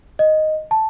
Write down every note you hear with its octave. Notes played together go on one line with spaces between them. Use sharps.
D#5
A5